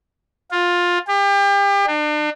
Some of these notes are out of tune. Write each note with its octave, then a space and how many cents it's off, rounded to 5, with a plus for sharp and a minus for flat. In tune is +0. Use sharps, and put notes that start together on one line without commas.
F4 +15
G4 +35
D4 +40